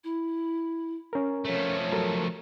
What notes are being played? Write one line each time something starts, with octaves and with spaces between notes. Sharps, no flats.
E4
C#4 A#4
F3 A3 C#5
F#3 A4 A#4